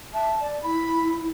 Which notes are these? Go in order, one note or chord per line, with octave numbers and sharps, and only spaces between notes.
E5 A5
D5
E4 B5